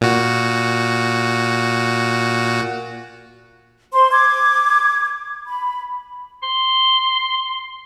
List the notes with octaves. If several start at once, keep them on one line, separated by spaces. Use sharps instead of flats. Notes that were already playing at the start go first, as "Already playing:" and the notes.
A#2 F#4
C5 C6
D6 G#6
B5
C6